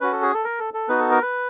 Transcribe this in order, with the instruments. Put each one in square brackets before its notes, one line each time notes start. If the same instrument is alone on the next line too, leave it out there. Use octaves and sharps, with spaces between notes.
[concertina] C#4 F#4 B4
A4
G#4
A4
A#4
A4
A4
B3 D#4 F#4 B4
A4
A#4
B4